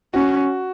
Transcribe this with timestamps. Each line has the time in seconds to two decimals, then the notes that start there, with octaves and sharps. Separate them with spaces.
0.14 C#4 F#4